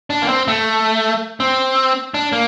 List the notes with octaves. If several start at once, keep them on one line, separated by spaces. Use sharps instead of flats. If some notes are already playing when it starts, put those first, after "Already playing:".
D4
A#3
C4
A3
C4
D4
A#3